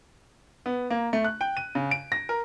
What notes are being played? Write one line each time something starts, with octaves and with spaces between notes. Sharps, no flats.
B3
A#3
A3
F#6
G5
D#7
C#3
D7
A#6
A#4